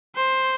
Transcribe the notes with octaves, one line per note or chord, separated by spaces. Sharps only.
C5